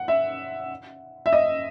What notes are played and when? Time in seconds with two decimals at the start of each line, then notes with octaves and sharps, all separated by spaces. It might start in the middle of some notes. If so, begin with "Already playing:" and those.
Already playing: F#5
0.08 E5
1.26 E5
1.33 D#5